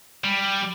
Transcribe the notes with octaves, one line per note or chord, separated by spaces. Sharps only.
G3